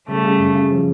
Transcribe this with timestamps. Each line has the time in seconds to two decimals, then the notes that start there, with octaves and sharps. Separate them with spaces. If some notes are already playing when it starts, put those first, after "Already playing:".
0.08 C#3 G3 A3
0.24 C#3
0.39 F#2
0.55 C#3
0.71 F3